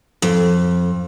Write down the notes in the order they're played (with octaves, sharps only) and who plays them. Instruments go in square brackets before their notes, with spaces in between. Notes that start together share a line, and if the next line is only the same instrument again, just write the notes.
[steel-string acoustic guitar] F2